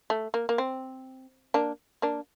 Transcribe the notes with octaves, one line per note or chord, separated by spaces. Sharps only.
A3
A#3
A#3
C4
A#3 D4
A#3 D4